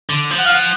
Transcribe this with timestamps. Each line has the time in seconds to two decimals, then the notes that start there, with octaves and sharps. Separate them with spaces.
0.10 D3
0.31 F3
0.38 F#5
0.46 F5
0.54 F#5